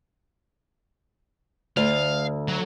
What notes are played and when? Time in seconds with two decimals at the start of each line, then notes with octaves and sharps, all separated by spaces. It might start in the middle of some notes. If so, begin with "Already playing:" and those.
1.77 D2 F5
2.48 F#3